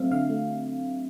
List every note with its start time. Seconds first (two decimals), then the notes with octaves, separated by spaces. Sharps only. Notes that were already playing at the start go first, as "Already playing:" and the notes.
Already playing: F#3 A3 C4 E5 F5
0.11 D3 F5
0.29 A3